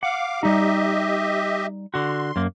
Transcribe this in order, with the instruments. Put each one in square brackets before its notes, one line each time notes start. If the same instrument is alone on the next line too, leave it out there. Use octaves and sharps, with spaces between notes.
[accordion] F5 D6 [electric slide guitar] F#5
[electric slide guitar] G3 D#4 [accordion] G4 D#5 E5
[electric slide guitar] D3 F#4 [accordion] C6
[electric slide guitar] F#2 A#3